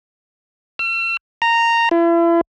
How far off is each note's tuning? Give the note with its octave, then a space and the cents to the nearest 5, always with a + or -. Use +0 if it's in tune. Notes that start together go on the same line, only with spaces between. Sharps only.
E6 +45
A#5 -10
E4 +40